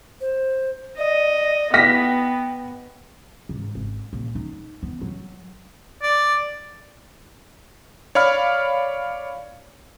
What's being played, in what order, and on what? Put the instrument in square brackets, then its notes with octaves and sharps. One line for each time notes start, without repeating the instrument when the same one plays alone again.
[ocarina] C5
[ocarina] D5 [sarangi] D#5
[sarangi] B3 [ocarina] G5 [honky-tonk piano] A#6 B6
[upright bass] G#2
G#1
A#1
D#4
B3
F#3
[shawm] D5
[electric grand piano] C#5 D5 F5 B5 F6